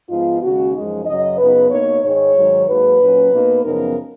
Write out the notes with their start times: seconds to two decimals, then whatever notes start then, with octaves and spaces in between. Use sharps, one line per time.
0.10 G#2 F3 B3 D#4 F4
0.42 D#2 C#3 G#3 C#4 F#4
0.74 F#2 F3 G#3 D#4
1.06 F#2 C#3 F#3 D#5
1.38 F#2 C#3 F#3 B3 D#4 B4
1.70 B2 A#3 D#4 C#5
2.03 G#2 D#3 G#3 D#4 C#5
2.35 G#2 D#3 F#3
2.67 G#2 F#3 A#3 D#4 B4
3.00 A#2 F#3 C#4
3.32 B2 A#3 D#4
3.64 F#2 C#3 F3 B3 D#4 A#4